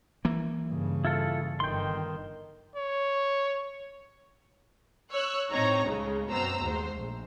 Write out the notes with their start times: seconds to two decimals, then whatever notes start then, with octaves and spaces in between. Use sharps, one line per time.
0.25 E3 A#3
0.67 G2 C#3
1.05 E4 F4 A4
1.60 G1 D#3 G5 C6
2.76 C#5
5.13 C#5 E6 F#6
5.51 A2 C4 D#4 C#5 A#5 A#6
5.86 C#2 C#3 G#3 A3
6.31 F#2 B2 C4 C5 A#5 E6
6.63 D#2 G#2 A3 C5
6.96 A#1